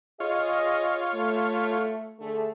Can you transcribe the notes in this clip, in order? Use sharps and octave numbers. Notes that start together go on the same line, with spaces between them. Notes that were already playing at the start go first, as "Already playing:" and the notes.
F4 G#4 C#5 D#5
A3
D3 A3 G#4